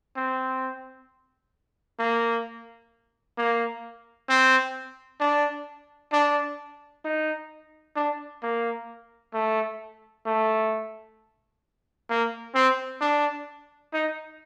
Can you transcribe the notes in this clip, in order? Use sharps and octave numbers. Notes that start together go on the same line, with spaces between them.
C4
A#3
A#3
C4
D4
D4
D#4
D4
A#3
A3
A3
A#3
C4
D4
D#4